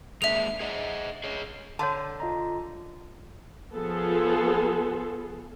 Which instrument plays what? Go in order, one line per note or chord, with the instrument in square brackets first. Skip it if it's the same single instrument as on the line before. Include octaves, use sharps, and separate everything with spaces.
[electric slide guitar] G#3 A#3 D4 [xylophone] E5 F7
[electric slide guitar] G#4 D#5 F#5
G#4 C#5 D#5
[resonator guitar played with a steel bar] D3 [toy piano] C#5 F#5 A5
[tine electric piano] F4 D#5 A#5
[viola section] F3 B3 G#4 A4